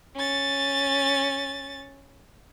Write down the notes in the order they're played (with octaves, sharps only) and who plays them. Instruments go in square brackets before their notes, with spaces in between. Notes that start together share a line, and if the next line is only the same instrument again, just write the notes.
[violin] C#4 A6